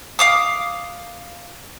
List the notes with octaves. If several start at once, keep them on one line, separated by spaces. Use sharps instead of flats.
F5 D6 D#6